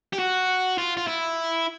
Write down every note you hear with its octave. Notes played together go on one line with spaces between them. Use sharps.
G4
F#4
F4
F4
E4